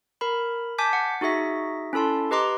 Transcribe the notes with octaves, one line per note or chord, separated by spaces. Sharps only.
A#4 B5
G#5 A5 D6 G6 B6
F#5
D#4 F#4 G#4 E5 A#6
C#4 E4 A4 A5 C6
G4 B4 D#5 A#5 C6 D6